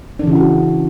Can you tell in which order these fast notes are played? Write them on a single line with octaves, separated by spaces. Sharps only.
D4 E3 C#3 E4 F#4